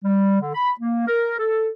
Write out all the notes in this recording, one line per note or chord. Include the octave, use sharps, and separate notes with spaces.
G3
D3
B5
A#3
A#4
A4